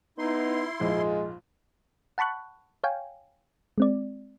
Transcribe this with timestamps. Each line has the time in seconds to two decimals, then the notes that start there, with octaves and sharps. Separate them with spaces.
0.18 B3 D#4 E4 C6
0.81 A#1 F2 G#2 G#3 F4
2.18 F#5 A5 B5 C#6 F#6
2.84 C#5 F5 G5 G#5
3.78 G#3 C4 D5